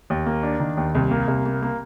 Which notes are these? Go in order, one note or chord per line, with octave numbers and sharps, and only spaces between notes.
D#2
A#3
D4
D#3
D#2
C2
A#3
C2
A#3
A#3